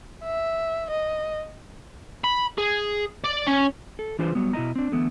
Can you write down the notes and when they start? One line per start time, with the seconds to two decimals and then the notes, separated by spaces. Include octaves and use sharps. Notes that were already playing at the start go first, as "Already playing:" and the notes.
0.24 E5
0.90 D#5
2.24 B5
2.58 G#4
3.24 D5
3.47 C#4
3.99 A4
4.19 E3 D4 F4 G#4 B4 C5
4.35 F#3 G3 B3
4.53 B2 E4 C#5 D#5 A#5
4.76 C4 D4
4.92 D3 E3 A3 B3